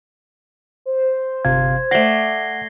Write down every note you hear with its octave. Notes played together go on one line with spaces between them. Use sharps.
C5
G1 C3 F5 G#6
A3 D5 F#5 A#6 C7 G7